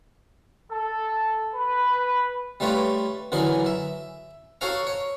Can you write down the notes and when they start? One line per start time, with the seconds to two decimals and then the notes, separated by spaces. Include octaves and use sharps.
0.70 A4
1.53 B4
2.60 G3 A3 F4 B4 C#5
3.32 D3 E3 F#3 G#4 A#4
3.66 E5
4.61 F#4 A4 C#5 F5 A#5
4.87 C#5